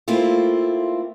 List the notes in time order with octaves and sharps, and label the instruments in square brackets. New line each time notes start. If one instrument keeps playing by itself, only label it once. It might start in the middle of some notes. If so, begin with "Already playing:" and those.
[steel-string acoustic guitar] A3 A#3 C4 E4 F4